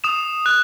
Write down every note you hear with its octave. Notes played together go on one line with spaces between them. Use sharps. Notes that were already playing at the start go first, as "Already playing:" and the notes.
D#6 E7
F#6